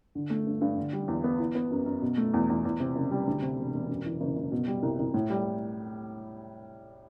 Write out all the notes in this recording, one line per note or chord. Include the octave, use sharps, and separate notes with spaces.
D3
A3
G2
G2
D3
G3
E2
B3
E3
B3
F#2
F#2
B2
A3
E2
E2
E2
C3
F#1
G3
D2
C3
E1
E1
F#2
E3
F#1
F#1
B2
G3
C2
C2
A2
G3